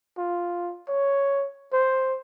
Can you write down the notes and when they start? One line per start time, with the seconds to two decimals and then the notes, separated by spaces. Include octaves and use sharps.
0.18 F4
0.88 C#5
1.73 C5